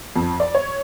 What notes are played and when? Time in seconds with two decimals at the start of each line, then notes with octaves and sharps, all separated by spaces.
0.16 F2
0.40 D5
0.55 C#5